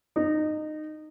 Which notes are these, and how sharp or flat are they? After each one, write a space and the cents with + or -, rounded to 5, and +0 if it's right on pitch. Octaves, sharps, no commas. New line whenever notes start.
D#4 -20